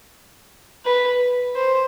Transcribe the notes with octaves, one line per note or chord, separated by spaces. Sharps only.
B4
C5